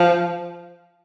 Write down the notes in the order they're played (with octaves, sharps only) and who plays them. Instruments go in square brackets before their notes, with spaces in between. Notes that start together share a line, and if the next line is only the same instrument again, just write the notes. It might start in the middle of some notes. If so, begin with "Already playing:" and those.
Already playing: [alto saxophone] F3